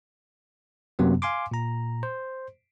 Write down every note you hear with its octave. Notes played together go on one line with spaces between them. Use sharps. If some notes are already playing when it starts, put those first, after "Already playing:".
F#2 C3 F#3 A#3 B3
F5 G#5 C6 D6
A#2 A#5
C5